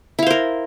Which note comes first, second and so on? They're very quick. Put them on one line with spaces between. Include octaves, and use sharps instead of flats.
E4 F5 C5 A#4